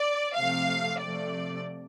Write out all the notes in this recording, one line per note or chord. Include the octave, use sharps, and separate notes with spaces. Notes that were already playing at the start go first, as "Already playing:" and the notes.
Already playing: D5
C3 F3 A3 F5
C3 F3 A3 D5